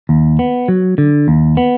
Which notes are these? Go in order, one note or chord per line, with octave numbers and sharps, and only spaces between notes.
D#2
B3
F#3
D3
D#2
B3